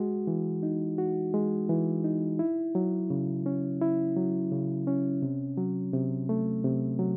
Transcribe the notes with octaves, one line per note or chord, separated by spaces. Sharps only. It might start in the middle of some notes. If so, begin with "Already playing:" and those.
Already playing: G#3 F#4
E3
D#4
F#4
G#3
E3
D#4
E4
F#3
C#3
C#4
E4
F#3
C#3
C#4
C3
F#3
C3
A3
C3
F#3